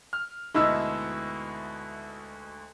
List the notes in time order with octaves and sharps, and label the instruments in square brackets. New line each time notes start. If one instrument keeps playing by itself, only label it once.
[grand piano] F6
[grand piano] D2 G#2 B2 [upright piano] E4 D#5 E6